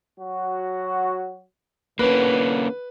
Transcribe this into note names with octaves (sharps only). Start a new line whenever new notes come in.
F#3 F#4
E2 D3 A#3 C#4 B4